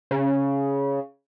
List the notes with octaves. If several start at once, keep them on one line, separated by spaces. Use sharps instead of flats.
C#3